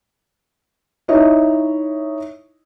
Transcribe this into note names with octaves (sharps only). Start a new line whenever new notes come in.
D#4 E4 C#5 D#5 E5